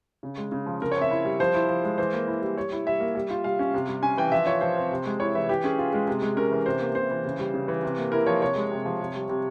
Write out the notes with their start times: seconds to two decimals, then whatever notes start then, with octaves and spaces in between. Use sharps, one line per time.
0.23 C#3
0.38 G#3
0.52 C#3
0.66 F3
0.81 C#3 A#4
0.92 C#5
0.96 C4
1.02 E5
1.11 E4
1.25 G3
1.40 F3 C5
1.54 E4
1.69 F3
1.84 G#3
1.98 E3 C5
2.13 A#3
2.27 E4
2.42 G3
2.56 G3 C#5
2.72 E4
2.86 G3 E5
3.00 A#3
3.15 G3
3.30 F4
3.44 G3 F5
3.59 C#4
3.74 C3
3.88 G3
4.02 C#4 G#5
4.17 E3 G5
4.32 F3 E5
4.46 F4 C#5
4.61 F3 C5
4.76 C4
4.91 C3
5.06 G#3
5.20 E4 C#5
5.35 E3 E5
5.49 E3 G4
5.64 C#4 G#4
5.78 F4
5.93 G#3
6.07 C3
6.22 G#3
6.37 C#4 A#4
6.52 E3
6.66 C3 C5
6.80 A#3
6.95 C3 C5
7.11 E3
7.25 C#3
7.39 G3
7.54 C#3
7.68 E3
7.83 C3
7.98 A#3
8.12 E4 A#4
8.27 F3 C#5
8.41 C3 C#5
8.56 G#3
8.71 C3
8.85 F3
9.00 C3
9.15 G3
9.29 C3